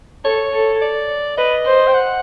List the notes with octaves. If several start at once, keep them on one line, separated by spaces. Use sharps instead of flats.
A4 C#5
A4
D5
B4 D#5
C5
G5
F#5